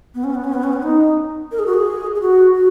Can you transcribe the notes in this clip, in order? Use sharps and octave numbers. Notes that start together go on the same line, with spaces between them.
B3
C#4
B3
C#4
B3
C#4
B3
D#4
A#4
G#4
F#4
G#4
G#4
F#4
F#4